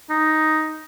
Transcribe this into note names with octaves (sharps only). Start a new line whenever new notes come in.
D#4